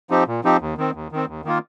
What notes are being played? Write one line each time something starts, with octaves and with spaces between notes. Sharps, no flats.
F3 C4 D#4 G4
A#2
F3 C4 D#4 G4
D#2
D#3 C4
D#2
D#3 C4
D#2
D#3 A#3 F4